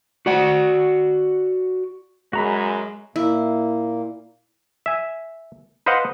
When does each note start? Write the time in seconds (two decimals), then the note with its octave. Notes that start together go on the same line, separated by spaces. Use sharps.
0.26 F#4 D5 F#5
2.33 F#2 G#3 F#4 A#5 B5
3.16 A#2 A#3 E4
4.86 E5 G#5
5.86 B4 C5 D#5 F5 F#5